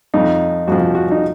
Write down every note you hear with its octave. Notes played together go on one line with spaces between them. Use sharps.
F2 F3 D#4
F2 F3 F#4
F#4
D#4